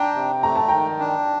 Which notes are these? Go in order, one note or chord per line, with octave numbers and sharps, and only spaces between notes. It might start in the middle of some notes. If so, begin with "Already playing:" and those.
Already playing: D4 G5 A#5
C3
A3 A#5
A5
D#3 G5 A#5
D4